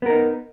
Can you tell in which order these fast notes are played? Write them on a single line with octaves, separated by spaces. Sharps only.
B3 A#4 D#4